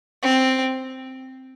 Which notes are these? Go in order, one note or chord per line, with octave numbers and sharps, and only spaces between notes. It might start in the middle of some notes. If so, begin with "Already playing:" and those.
C4